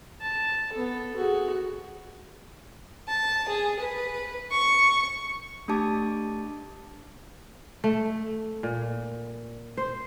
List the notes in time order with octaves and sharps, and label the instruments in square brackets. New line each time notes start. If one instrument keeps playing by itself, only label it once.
[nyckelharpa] A5
B3 A4
F#4 G#4
[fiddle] A5
G#4
B4
C#6
[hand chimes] A3 D4 G4 A5 D6
[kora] A3
A#2
C5